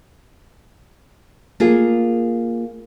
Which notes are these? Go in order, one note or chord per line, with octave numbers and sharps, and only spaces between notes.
A#3 F4 G#4